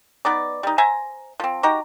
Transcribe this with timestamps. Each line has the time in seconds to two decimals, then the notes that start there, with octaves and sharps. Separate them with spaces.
0.25 B3 D#4 D5
0.63 G3 D#4
0.78 C5 E5 G#5 A#5
1.40 F3 C4
1.63 D#4 F#4 G4 A#5